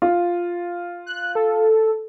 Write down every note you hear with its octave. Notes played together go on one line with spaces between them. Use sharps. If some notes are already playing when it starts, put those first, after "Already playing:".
F4
F#6
A4